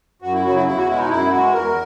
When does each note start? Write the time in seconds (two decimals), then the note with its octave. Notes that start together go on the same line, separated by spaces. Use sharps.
0.22 F#2 F#4
0.33 E4
0.43 C#3 F#3 F#4
0.55 E4
0.66 E2 E4
0.76 F#4
0.87 B2 G#3 E4
0.98 D#4
1.09 F#2 E4
1.31 E3 G#3 F#4
1.53 E2 A#4